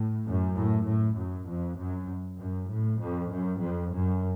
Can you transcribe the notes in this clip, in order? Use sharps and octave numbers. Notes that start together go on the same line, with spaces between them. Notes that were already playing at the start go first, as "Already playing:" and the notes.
Already playing: A2
F#2
A2
A2
F#2
F2
F#2
F#2
A2
F2
F#2
F2
F#2